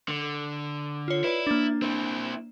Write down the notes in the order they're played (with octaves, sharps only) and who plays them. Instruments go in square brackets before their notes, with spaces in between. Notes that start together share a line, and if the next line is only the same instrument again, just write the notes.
[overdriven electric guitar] D3
[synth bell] F4 C#5
[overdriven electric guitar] E4 [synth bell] B4 D5
[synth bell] A#3 D4
[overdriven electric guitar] C4 E4